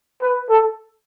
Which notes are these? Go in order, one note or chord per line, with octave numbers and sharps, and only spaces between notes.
B4
A4